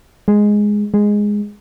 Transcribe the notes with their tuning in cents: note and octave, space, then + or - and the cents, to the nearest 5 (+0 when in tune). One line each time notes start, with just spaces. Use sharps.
G#3 +0
G#3 -5